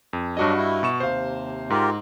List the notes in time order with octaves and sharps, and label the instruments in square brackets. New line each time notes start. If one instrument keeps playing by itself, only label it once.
[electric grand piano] F2
[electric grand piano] G2 F#4 D#5 [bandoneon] F#3 D4
[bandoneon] E4
[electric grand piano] B2 C#6 E7
[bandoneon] D#2 C3 [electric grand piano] C5 F5
[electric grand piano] G#2 [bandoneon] F4 G4 A#4